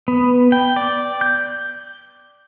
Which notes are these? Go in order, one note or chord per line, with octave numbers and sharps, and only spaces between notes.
B3
G5
D5
G6